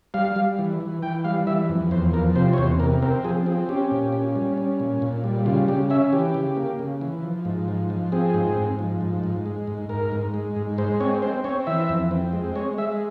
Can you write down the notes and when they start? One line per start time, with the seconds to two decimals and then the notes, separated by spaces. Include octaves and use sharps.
0.14 G3 F5
0.36 G3
0.59 E3
0.80 E3
1.03 E3 G5
1.24 G3 F5
1.47 E3 E5
1.69 F2
1.91 E2 C5
2.13 F3 A#4
2.35 C3 C5
2.53 C#5
2.58 E2 C5
2.80 C3 A#4
3.02 C4 A#4
3.24 F3 G#4
3.46 C4 G#4
3.69 C#4 G4
3.91 A#2
4.12 C#4
4.35 G3
4.58 C#4
4.80 A#2
5.02 A#2
5.24 G3
5.46 C#3 F4
5.68 C#3 G4
5.90 C#4 E5
6.13 E3 G4
6.34 C#3
6.57 A#3
6.79 C#3
7.01 E3
7.23 F3
7.45 G#2
7.68 F3
7.90 F3
8.12 C4 G#4
8.34 G#2
8.56 G#2
8.79 F3
9.01 G#2
9.23 G#2
9.46 G#3
9.67 G#2
9.89 G#2 A#4
10.12 G#2
10.34 G#3
10.56 G#2
10.78 G#3 C5
11.00 C4 C#5
11.22 C4 C5
11.44 C4 C#5
11.67 E3 E5
11.89 F2
12.11 C4
12.33 G#3
12.55 G#3 C#5
12.78 G#3 E5